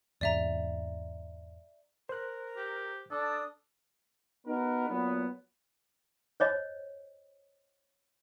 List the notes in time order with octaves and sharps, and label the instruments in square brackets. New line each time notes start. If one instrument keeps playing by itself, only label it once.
[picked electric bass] E2 G#2 C3 [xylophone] D5 E5 A#5
[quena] A#4 [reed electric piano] C5 F#6
[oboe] G4
[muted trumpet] D4 [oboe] A4 [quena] D#6
[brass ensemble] B3 D#4 F#4 A#4 B4
A#2 F#3 B3
[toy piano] C5 C#5 D#5